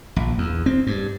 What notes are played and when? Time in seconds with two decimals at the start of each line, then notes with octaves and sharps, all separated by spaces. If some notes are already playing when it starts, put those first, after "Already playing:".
0.16 A#1
0.38 E2
0.66 C4
0.87 G2